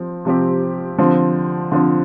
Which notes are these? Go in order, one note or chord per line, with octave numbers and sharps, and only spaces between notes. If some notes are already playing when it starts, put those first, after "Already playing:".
Already playing: F3 C4
C3 F3 C4 G4
D3 F3 C4
D3 F3 C4